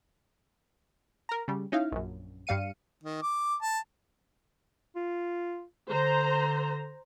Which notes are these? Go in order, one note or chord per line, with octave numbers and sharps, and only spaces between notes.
A#4 A#5
C#3 G3
C#4 D#4 E4 F5
A#1 F#2
G2 G3 F5 C#7 D#7
D#3
D6
A5
F4
D3 C5 A#5